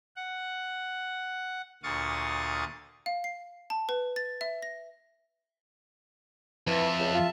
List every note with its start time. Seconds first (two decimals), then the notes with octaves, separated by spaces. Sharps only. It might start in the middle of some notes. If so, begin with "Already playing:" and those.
0.16 F#5
1.83 D2 A#2 F5 C#6 D#6 A6
3.06 F5
3.24 C7
3.70 A5
3.89 B4
4.16 A6
4.41 E5
4.62 A#6
6.67 F2 E3 E5 A5
6.99 C#2
7.14 F4